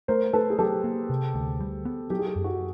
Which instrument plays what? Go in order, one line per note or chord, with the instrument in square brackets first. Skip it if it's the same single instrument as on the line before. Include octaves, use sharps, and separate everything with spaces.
[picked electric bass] A3 [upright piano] A#4 C5
[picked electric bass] A3 [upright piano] A4 B4
[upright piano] G#4
[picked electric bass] F#3 [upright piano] G4 A4
[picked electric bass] A#3
C3
D2
G3
B3
[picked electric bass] F#3 [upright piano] G4
[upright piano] G#4
G4
[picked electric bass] F#2
[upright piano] F#4